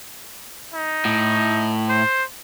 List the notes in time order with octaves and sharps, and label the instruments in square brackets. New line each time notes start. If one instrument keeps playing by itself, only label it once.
[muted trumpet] D#4
[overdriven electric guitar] A2
[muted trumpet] C5